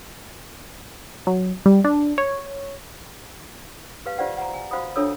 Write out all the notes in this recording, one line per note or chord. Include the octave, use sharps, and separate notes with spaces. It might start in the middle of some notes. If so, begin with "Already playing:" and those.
F#3
G3
D4
C#5
G4 B4 F5
F4 G4 C5 D5 F5 F#5
F#5 A#5
G#5
F#4 C5 F5 F#5 B5 D#6
D4 F4 A4 C#5 D#6 E6